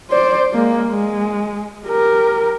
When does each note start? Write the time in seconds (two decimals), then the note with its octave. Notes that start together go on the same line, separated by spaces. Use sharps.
0.10 C5 D5
0.53 G#3 A#3
0.89 G#3
1.87 G4 A#4